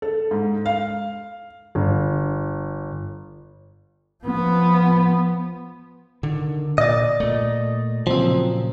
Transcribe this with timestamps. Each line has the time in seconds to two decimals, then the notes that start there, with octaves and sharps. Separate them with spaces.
0.02 A4
0.31 G#2
0.66 F5
1.75 G1
4.24 F3 B3
6.23 D3 D#3
6.78 A#2 D5 D#5
7.20 A#2 A3
8.07 A#2 C#3 F3 F#3 C4